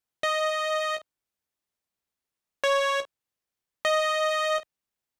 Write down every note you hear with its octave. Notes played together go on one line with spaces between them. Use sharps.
D#5
C#5
D#5